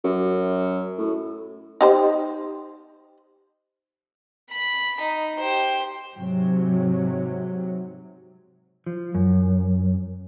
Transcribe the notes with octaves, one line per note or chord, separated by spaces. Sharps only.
F#2
A2
D#4 G4 C5
B5
D#4
G4 C5
G#2 C3 F#3
F3
F#2